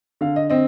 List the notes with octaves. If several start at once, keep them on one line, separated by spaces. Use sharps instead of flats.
D3 F5
D#5
C4 D#5